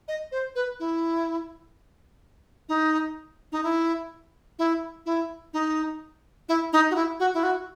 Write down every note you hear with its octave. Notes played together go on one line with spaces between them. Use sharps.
D#5
C5
B4
E4
D#4
D#4
E4
E4
E4
D#4
E4
D#4
F#4
E4
F#4
E4
F#4